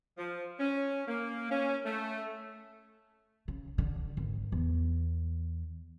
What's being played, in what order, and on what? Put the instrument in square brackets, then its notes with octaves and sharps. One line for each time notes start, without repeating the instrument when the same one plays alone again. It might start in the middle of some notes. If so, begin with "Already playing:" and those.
[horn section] F3
C#4
A#3
C#4
A3
[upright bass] C#3
D3
G#1
E2